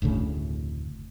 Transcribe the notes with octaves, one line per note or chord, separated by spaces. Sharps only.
F1 D2 A2 C#3